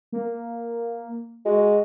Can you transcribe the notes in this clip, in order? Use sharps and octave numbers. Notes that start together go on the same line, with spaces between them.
A#3
G#3 F#4